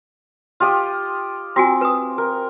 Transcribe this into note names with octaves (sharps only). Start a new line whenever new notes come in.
F4 G4 D#5
C4 F4 F#4 G#5
B4 D#6
A#4